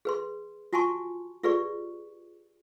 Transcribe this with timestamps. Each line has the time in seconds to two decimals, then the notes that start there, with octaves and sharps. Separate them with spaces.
0.05 G#4 B4 C6
0.73 F4 F#4 G#5 A5 C6 C#6
1.43 F4 G4 G#4 B4 D5 C#6